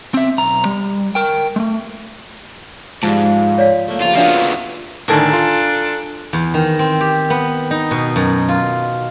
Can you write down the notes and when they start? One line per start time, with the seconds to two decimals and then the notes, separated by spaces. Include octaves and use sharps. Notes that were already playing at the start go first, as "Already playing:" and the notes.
0.14 C4 E5
0.38 B1 A#5
0.65 G3
1.15 A#4 G5
1.56 G#3 A3
3.03 G#2 F3 G3 A5
3.58 C#5 D5 F5
3.88 A3 A#3
4.02 C#3 F3 G3 F4
4.16 F3 B3 D4 F4 F#4 D5 E5
5.08 A2 D3 D#3 D4 A4 A#4 G#5 A5
5.33 F4
6.33 E2
6.54 D#3
6.79 C4
7.01 G4
7.30 B3
7.71 D#4
7.91 B2
8.16 F#2
8.49 F4